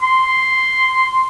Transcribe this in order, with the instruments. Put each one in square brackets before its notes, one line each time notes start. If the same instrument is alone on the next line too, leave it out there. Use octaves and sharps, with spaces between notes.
[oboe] C6